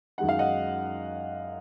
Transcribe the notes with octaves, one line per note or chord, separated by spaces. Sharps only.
F#2 D#3 G#3 D#4 F#5
F5
D#5 F#5